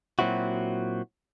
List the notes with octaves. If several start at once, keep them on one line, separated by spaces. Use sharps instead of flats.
A#2 F#3 C4 E4 F#4